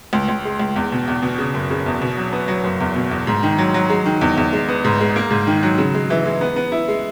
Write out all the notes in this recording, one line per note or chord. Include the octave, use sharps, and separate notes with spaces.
C#2
C#2
G#3
C#2
E2
B2
E2
B2
C#3
F#1
C#3
E2
B2
F#3
B3
F#3
F#1
E2
B2
E2
G#2
D#3
F#3
F#3
G#3
D#3
E2
E2
G#3
B3
G#2
G#3
A#3
G#2
D#3
F#3
C#3
G#3
E3
G#3
B3
B3
E4
G#3